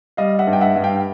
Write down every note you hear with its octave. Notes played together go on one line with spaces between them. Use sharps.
G3 D#5 F5
E5 F#5
G2
G5
E5 F#5
G2
F5 G5